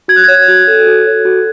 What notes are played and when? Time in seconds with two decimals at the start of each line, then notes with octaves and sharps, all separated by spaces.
0.08 F#4 G#6
0.16 F#6
0.24 C#5 G#6
0.48 F#4
0.67 A4
0.87 F#4
1.06 C#5
1.25 F#4